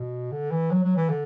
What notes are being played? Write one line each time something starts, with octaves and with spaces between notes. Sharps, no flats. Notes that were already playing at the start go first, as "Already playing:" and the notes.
Already playing: B2
D3
E3
F#3
F#3
E3
D3